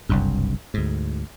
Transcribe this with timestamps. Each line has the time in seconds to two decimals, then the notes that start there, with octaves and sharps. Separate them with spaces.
0.09 F#1 C2 G2
0.74 D2 G#2